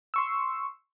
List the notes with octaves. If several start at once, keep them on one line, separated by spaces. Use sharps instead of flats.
C6 C#6 E6